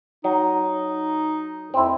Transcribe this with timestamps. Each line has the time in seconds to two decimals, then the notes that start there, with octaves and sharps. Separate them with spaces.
0.24 F#3 D#4
1.74 F2 C4 E4